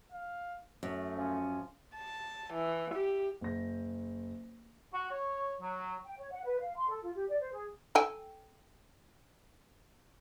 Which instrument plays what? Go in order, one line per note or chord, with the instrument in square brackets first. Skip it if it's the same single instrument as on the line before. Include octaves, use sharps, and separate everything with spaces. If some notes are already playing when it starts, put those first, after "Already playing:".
[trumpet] F5
[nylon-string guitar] F#2 [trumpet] A3
[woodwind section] F3 C#4
[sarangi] A5
E3
G4
[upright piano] F#1 A#6
[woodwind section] F#4
C#5
F#3
[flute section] G5
C#5
F#5
B4
F5
C6
A4
F4
G4
D5
C5
G#4
[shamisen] A4 G5 G#5